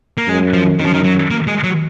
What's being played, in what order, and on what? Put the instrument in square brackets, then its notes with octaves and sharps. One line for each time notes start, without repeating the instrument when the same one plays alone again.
[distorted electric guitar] A#3
[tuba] F#2 [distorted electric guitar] G#3
[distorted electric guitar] F3
[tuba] F#2 [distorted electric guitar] D#3
[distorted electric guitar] F3
D#3
F#3
A#3
G#3
F#3